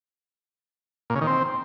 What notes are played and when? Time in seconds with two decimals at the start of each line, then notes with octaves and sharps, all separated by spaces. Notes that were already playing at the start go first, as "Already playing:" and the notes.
1.10 A#2
1.16 C#3
1.21 D#3
1.27 C4